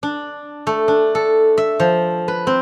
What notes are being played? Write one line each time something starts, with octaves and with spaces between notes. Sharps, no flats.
D4
A3
D4
A4
E5
F3
B4
C4